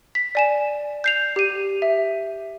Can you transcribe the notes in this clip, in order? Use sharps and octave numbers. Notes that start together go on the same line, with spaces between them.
B6
D5 G#5 E7
G6 C7 F7
G4 D#7
E5